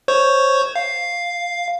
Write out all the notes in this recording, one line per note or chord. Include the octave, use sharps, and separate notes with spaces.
C5 C#5 C#6
F5